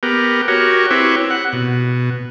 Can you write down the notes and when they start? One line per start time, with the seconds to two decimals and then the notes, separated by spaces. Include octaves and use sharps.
0.03 B3 G4 A#4
0.48 F#4 G4 A#4 C#5
0.91 C4 E4 G4 B4 C#5
1.30 F#5
1.53 B2